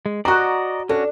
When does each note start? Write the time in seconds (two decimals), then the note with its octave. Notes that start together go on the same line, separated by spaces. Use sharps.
0.06 G#3
0.25 F#4 C5 D5 D#5 A#5 C#6
0.89 C#4 D4 F#4 A4